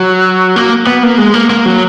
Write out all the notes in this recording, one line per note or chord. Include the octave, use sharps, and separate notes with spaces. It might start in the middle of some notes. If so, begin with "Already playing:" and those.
Already playing: F#3
A#3
B3
A#3
G#3
A#3
A#3
F#3